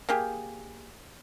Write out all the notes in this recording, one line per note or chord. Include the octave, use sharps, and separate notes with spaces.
A#3 G4 G#4